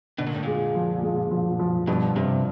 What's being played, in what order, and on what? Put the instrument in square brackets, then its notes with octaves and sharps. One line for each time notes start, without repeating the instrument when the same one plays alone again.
[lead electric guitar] B2 [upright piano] D3
[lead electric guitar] A#2
A2
[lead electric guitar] A#2 [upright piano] G#3
[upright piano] F3
G#3
F3
F3
[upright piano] G2 [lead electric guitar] B2
[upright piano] G2 [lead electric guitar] C3